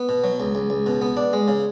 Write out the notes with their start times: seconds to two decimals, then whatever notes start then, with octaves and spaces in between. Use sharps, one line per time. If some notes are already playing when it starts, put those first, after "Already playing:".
Already playing: B3
0.09 B2
0.24 F#3
0.40 C#2
0.55 C#2
0.70 C#2
0.86 B2
1.01 B3
1.17 D4
1.33 G#3
1.48 C#3